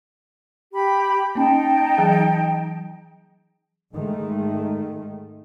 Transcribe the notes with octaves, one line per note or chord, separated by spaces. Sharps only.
G4 B5
A#3 C#4 D#4 G5 A5
E3 F#3 G#4
G#2 D#3 G#3 A3